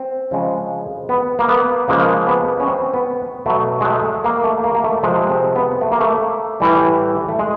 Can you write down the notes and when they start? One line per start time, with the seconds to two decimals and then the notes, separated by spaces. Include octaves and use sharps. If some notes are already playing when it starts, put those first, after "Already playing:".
Already playing: C4
0.31 C#3 F3 G#3
1.09 B3
1.39 A#3
1.48 B3
1.88 C#3 F3 G#3 A#3
2.27 B3
2.60 C#4
2.67 C4
2.94 B3
3.46 B2 F#3 A3
3.81 G#3
3.85 A3
4.24 A#3
4.44 A3
4.64 A#3
4.75 A#3
4.84 A3
5.03 C3 F3 G#3
5.29 C4
5.56 B3
5.81 A3
5.92 A#3
6.00 A3
6.60 A2 E3 G3
7.29 A3
7.39 G#3